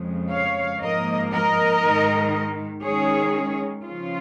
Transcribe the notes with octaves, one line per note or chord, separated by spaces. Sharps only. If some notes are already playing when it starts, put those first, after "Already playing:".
Already playing: F2 C#3 G#3
C#5 F5
G#2 F3 A#3 A#4 D#5
A#4 D#5
G#2 D#3 G#3
D#3 G#3 C#4 G#4 C#5
C#3 F3 C#4 F4